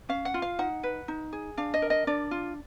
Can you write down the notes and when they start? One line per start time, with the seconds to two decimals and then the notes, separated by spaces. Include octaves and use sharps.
0.09 C#4 F5
0.25 F#5
0.34 F4
0.42 F5
0.59 D#4 F#5
0.83 B4
1.08 D#4
1.33 G#4
1.57 D4 F5
1.74 D#5
1.82 A#4
1.90 D#5
2.07 D4 D5
2.31 F4